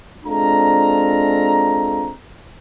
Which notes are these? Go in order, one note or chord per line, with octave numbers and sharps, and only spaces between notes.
G#3 C4 D4 F4 A4 A#5